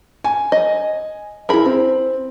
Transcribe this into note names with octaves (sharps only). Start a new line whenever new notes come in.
G#5
D#5
E4 G#4 A#4 B5
C4